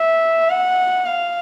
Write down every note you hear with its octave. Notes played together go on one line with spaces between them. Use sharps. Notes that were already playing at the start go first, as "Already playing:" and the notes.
Already playing: E5
F#5
F5